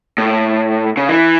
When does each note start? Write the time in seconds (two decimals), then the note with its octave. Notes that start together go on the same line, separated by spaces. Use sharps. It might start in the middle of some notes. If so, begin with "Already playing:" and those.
0.18 A2
0.97 C#3
1.09 E3